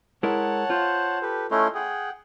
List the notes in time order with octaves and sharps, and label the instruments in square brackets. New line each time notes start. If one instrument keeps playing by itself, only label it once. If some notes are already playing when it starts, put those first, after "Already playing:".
[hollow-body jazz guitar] G#3 E4 A#4 [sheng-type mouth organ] C#5 F#5 A5
[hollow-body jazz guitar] F4 [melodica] C5
[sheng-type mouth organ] G4 A4 B4
[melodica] A3 C#4 E4 [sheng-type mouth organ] A4 D#5 C6
[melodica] G#4 [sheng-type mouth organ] F#5 G5